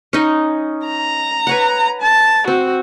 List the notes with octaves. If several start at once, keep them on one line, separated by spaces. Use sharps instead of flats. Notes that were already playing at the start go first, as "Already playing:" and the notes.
C#4 D#4 D#5
A#5
B4 C#5 F#5
A5
C4 F#4